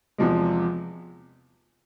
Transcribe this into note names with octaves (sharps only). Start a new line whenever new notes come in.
E2 C3 F3 G#3